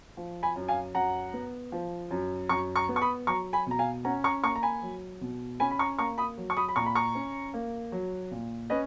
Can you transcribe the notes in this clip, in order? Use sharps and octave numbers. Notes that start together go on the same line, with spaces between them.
F3
G#5 B5
F#2
F5 G#5
F#2 F#5 A#5
B3
F3
F#2
F#2 A#5 C#6
A#5 C#6
B3
C#6
B5 D#6
F#3 A#5 C#6
G#5 B5
B2 A#5
F5 G#5
C#4 F#5 A#5
A#5 C#6
A#3 A#5 C#6
A#5
G#5 B5
F#3
B2
C#4 G#5 B5
B5
A#5 C#6
A#3 A#5 C#6
B5 D#6
F#3
C#6
B5 D#6
B5
A#2 A#5 C#6
B5
A#5 C#6
C#4
A#3
F#3
A#2
C#4 B4 D#5